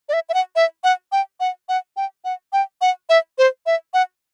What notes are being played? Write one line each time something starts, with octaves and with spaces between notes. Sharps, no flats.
D5
E5
E5
F#5
E5
F#5
G5
F#5
F#5
G5
F#5
G5
F#5
E5
C5
E5
F#5